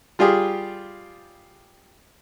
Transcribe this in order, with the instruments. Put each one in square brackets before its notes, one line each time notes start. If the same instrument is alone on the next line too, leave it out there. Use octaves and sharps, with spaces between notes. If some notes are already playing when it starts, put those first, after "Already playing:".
[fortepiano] G3 F4 G4 G#4